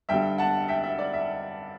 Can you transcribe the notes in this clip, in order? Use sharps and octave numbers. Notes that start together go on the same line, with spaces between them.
G2 D3 G3 E5 G5
F#5 A5
E5 G5
E5
D5
E5